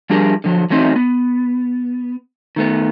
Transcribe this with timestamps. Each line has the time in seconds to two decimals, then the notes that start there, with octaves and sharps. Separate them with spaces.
0.10 F3 G3 D4 G4 G#4 A#4
0.44 D3 F3 F#3
0.70 E3 F#3 A3 C4 D#4
0.96 B3
2.56 D#3 A3 B3